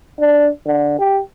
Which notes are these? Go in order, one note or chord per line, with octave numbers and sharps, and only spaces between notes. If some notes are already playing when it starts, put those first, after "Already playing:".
D4
D3
G4